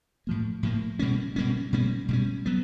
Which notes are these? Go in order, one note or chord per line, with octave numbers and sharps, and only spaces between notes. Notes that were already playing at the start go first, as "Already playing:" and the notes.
A2 F3 A#3
A2 F3 A#3
B2 G3 A#3 C#4
B2 G3 A#3 C#4
B2 G3 A#3 C#4
B2 G3 A#3 C#4
F#3 B3